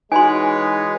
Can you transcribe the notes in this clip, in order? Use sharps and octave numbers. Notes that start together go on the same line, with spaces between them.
E3 G#3 D#4 F#4 B4 C#5 G#5 C6